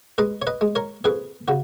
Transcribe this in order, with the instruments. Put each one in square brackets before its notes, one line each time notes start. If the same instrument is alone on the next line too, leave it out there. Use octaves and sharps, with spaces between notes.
[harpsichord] G#3 B4 D#5
C#5
B4 D#5
G#3
A#4 C#5
F2 G#4 B4
C#3 F#4